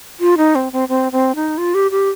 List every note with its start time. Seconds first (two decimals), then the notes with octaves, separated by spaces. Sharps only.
0.20 F4
0.37 D#4
0.55 C4
0.73 C4
0.89 C4
1.12 C4
1.35 D#4
1.58 F4
1.74 G4
1.91 G4